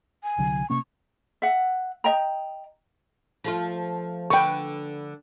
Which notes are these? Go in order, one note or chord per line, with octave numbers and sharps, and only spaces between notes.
G#5
C2 D3 F#3
C3 A#3 C#4 C#6
E5 F#5
D#5 G5 A#5
F3 A3 F4
D3 B4 G5 C#6